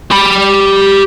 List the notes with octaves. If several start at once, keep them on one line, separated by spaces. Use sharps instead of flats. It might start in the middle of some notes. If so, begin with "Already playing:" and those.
G4 B5